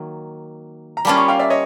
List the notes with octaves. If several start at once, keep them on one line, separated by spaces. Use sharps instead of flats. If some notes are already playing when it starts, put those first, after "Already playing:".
Already playing: D#3 F#3 A#3
A#5
G3 A#3 C#4 F4 A5 B5
B5 C#6
F5 G5
D5 E5
C#5 D#5